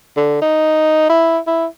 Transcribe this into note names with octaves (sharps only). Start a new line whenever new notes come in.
D3
D#4
E4
E4